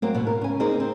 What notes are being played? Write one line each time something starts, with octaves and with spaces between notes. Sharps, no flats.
F#3 A#3 C4
D#2 B2
A#4
C#3 G#5
A#3 C4 D#4 G#4 A#4
C4